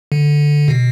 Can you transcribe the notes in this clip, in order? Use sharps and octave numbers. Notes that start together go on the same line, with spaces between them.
D3
B2